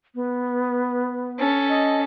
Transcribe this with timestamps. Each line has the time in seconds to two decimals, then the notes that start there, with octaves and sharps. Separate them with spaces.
0.15 B3
1.39 C#4 A4
1.69 D#5